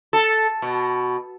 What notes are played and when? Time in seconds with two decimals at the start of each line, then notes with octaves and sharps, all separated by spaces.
0.13 A4
0.62 B2